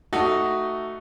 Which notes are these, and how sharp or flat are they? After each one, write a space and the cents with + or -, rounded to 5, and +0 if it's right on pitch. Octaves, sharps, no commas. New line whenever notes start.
A3 +10 D#4 +0 F#4 +10